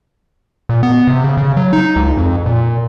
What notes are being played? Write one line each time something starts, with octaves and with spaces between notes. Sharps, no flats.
A#2
B3
C3
C#3
C#3
F#3
D#4
C#2
F2
A#2